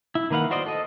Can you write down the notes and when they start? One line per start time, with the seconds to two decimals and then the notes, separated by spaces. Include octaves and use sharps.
0.15 E4
0.31 D#3 A#3 B4 F5 F#5
0.51 F#4 C5 D5 D#5
0.66 A4 D#5